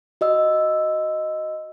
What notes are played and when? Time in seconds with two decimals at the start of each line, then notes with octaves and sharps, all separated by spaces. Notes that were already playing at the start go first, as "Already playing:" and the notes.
0.21 F#4 D#5 E6